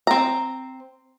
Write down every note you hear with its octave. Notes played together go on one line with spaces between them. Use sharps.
C4 A#5